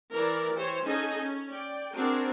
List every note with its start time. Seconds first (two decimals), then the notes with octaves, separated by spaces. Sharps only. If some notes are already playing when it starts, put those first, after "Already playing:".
0.12 E3 E4 A#4 D5
0.55 E3 G4 C5 C#5
0.84 C#4 D#4 G#4 A4 D#5 G#5
1.21 C#4
1.50 D5 G5
1.95 C4 D4 F#4 G#4 A#4